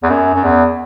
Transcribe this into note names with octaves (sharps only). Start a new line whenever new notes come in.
E2
F#2
F#2
E2